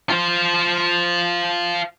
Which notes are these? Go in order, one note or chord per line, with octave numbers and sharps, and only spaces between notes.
F4 C5